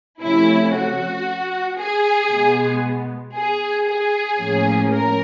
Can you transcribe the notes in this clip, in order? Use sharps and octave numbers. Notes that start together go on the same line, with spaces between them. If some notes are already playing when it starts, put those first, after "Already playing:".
C3 F3 A3 C#4 E4
F#4
G#4
B2 G#3 B3
G#4
G#4
A2 F3 A#3 C#4
A#4